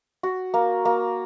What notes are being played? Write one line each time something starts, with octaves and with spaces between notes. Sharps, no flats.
F#4
A#3
A#3